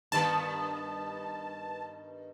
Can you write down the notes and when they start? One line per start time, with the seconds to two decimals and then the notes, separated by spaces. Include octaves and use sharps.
0.12 G2 D#3 B3 A5